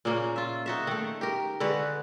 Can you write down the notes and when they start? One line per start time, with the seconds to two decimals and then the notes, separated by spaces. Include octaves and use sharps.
0.05 A#2 C#3 A#3 C#4
0.36 F4 E5
0.66 D#4 F#4 E5
0.87 D#3 A3
1.21 G4 A#4
1.60 D3 G#3 F#4 B4